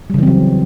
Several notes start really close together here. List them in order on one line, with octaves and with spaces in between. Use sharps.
G3 C#3 E3 C4 F#3